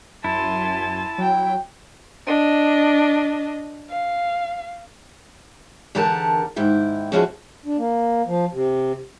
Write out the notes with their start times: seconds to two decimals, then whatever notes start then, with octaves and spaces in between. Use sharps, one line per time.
0.24 F#2 E4 G#5 A5 C6
1.18 F#3 G5
2.27 D4 D#5
3.89 F5
5.95 E2 D3 G4 A#4 F#5 A5
6.56 D#2 G#2 E4 G5
7.12 B2 F3 C#4 E4 F#4 G#4
7.65 D4
7.78 A#3
8.27 F3
8.53 C3